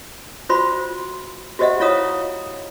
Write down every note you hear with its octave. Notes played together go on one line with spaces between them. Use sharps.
F4 F#4 C5 B5 C6
F#4 G4 C5 D#5 E5 F#5
E4 F4 C#5 F5 A#5 D#6